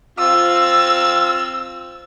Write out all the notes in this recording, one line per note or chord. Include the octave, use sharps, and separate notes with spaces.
C4 F4 E6